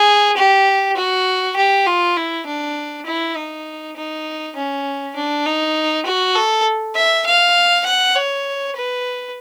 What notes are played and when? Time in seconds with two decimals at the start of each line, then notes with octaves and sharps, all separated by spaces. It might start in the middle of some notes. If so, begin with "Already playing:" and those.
Already playing: G#4
0.37 G4
0.97 F#4
1.56 G4
1.87 F4
2.16 E4
2.46 D4
3.06 E4
3.36 D#4
3.96 D#4
4.56 C#4
5.16 D4
5.46 D#4
6.06 F#4
6.36 A4
6.95 E5
7.26 F5
7.86 F#5
8.16 C#5
8.76 B4